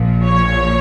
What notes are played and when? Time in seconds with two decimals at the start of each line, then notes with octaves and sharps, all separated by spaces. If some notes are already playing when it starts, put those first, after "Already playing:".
Already playing: A#1 A#2 F3
0.24 C#5